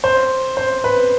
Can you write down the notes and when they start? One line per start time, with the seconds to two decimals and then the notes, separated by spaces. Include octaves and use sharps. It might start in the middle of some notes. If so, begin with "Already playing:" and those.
0.04 C5
0.57 C5
0.84 B4